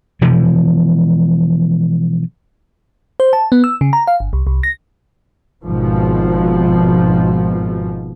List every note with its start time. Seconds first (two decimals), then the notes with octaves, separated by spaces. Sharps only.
0.21 B2 E3 F3 G#3
3.20 C5
3.33 A5
3.52 B3
3.64 E6
3.81 C#3
3.93 A#5
4.07 F5
4.20 G1
4.33 C2
4.47 C2
4.63 A#6
5.64 G#1 G#2 B2 F3